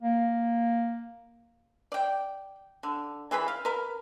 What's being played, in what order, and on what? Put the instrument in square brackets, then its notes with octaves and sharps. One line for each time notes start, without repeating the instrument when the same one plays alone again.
[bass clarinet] A#3
[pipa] D5 G5
D3
E3 G#4 B4 B5
F5
A#4 B4